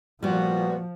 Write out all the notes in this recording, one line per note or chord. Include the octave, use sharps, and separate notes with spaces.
A#2 F3 G3 B3 F#4